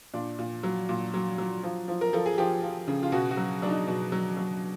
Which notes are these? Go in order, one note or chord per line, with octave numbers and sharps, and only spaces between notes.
A#2 D4
A#2
F#3
A#2
F#3
F#3
F3
F3
A#4
F3 A4
G#4
F3 G4
F3
C#3
F4
B2 F#4
F#4
F#3
F#3 D4
D#4
B2
F#3
F#3